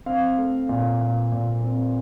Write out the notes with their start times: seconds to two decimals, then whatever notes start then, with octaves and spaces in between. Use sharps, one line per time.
0.06 C4 F5
0.38 A3
0.69 A#2
1.01 A#2
1.32 A#2
1.63 C4